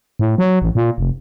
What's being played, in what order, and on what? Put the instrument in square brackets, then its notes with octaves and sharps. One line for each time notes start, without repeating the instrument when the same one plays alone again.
[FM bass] A2
F#3
A1
A#2
F1